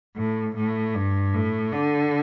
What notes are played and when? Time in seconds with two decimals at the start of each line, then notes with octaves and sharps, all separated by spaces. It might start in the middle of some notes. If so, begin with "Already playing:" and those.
0.17 A2
0.56 A2
0.95 G2
1.33 A2
1.72 D3